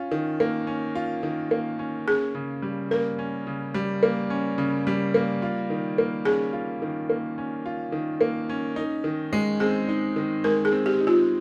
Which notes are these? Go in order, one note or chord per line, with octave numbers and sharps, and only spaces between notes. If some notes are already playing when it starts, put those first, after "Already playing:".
Already playing: C#4 F4
D#3
A#3
C#4
F4
D#3
A#3
C#4
C#4 G#4
C#3
G3
A#3 A#4
C#4
C#3
G3
A#3
C#4
C#3
G3
A#3
F4
D#3
A#3
C#4 G#4
F4
D#3
A#3
C#4
F4
D#3
A#3
C#4
D#4
D#3
G#3
C4 G#4
D#4
D#3
G#3 A#4
G#4
C4
G4
D#4
F4